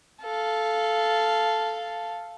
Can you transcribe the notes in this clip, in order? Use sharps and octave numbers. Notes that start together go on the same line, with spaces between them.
A4 F5